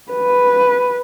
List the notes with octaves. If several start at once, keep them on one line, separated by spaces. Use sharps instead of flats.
B4